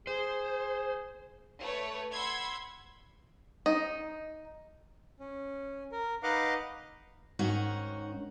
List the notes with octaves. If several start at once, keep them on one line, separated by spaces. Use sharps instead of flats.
G#4 C5
A3 B4 C#5
F#5 B5 C6 E6 G#6
D#4
C#4
A#4
D#4 B4 D#5 F5 F#5 D6
G#2 D#3 C#4 D#4 F#4